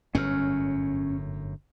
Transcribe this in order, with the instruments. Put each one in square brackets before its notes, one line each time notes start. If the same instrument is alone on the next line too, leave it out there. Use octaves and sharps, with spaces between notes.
[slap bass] G1 F#2 A2 [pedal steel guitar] C#4 F6